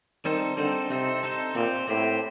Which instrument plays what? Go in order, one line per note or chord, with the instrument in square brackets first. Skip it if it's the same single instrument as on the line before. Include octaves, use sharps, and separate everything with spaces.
[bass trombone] D#3 [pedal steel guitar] G3 C4 D#4 A4 C5
[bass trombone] D3 [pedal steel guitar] G3 C4 D#4 A4 C5
[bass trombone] C3 [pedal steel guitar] C4 D#4 A4 C5
[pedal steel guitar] C4 D#4 A4 C5
[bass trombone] A#2 [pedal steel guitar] C4 G4 C5
[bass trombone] A2 [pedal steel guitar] C4 G4 C5